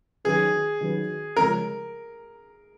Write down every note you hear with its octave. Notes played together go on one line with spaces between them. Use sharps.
D#3 F#3 C#4 F#4 G#4 B4
D#3 F#3 C#4 F#4 B4
C#3 F3 G#3 C#4 A#4